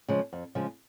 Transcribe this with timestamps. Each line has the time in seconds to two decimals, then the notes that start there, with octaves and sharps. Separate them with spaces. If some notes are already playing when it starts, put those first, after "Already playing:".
0.08 C#3 F3 G#3
0.33 F2
0.55 C#3 F3 G#3